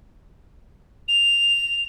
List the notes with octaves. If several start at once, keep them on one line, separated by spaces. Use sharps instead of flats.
F7